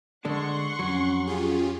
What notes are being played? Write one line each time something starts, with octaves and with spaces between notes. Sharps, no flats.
D3 G#3 D4 F#5 C6 C#6
F2 F#3 C#4
F4 G4 G#4